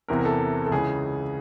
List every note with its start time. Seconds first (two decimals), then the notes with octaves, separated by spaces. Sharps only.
0.08 E2 C3 E3 A#4
0.19 A#4
0.25 A4
0.66 A4
0.71 C#2 C#3 E3 G#4